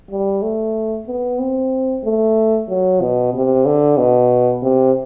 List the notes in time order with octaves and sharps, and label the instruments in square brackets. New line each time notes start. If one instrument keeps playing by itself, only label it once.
[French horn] G3
A3
B3
C4
A3
F#3
B2
C3
D3
B2
C3